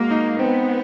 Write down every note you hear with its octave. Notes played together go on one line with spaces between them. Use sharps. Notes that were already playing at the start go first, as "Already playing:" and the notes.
Already playing: G#3 A#3 F#4
D#4
B3 C4